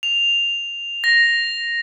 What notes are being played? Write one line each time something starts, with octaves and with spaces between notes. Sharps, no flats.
F7
A#6